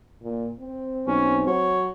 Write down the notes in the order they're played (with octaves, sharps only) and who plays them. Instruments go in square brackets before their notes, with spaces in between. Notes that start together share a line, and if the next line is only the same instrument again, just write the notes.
[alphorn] A#2
C4
[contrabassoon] B1 [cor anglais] C#4
[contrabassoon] F#3 [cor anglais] C#5